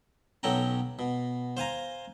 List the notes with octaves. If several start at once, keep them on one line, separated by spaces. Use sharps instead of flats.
B1 F#3 C#4 A4 G5 A#5
B2
C5 F5 G#5 A#5